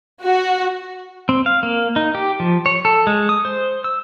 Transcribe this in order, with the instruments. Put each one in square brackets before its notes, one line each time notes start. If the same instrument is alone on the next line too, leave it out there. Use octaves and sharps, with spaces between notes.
[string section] F#4
[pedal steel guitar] C4
F5
A#3
D#4
G4
F3
C#5
A4
G#3
D#6
C5
E6